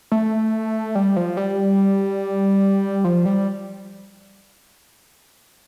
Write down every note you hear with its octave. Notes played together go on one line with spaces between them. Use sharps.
A3
G3
F3
G3
F3
G3